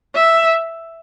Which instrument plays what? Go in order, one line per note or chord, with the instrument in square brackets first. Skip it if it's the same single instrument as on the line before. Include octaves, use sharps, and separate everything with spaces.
[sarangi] E5